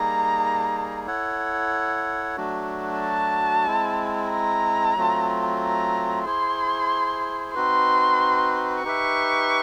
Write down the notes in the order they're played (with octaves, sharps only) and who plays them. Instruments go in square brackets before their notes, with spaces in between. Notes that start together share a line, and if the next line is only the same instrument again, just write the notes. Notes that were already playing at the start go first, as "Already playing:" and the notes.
Already playing: [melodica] G3 A#3 D#4 G#4 [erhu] A#5
[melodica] E4 A4 C#5 F#5
F#3 A3 D4 F#4
[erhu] A5
[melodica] G#3 C4 E4
[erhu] A#5
[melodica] F#3 A3 C4 F4
[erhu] A#5
[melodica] E4 G#4 C5 [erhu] C6
[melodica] C4 D#4 F#4 B4 [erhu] C6
[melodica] D#4 G4 B4 E5 [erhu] C#6